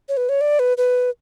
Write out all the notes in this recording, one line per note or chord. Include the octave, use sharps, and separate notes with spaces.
C#5
B4
C#5
D5
B4
B4